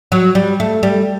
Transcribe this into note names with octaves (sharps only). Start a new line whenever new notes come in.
F#3
G3
A3
G3